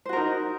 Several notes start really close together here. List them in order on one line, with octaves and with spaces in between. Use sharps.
C5 F#4 A#4 D#4